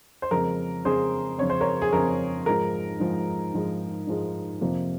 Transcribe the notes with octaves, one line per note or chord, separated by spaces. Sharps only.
C5
F2 C#3 G#3 C4 A#4
F2 C#3 G#3 C4 G#4 C5
F2 C#3 G#3 C4 C#5
C5
A#4 C#5
G#4
F2 C#3 G#3 C4 A#4
G#2 F3 G#3 A#4
G#2 F3 G#3
G#2 F3 G#3
G#2 F3 G#3
F2 C3 F3 A#3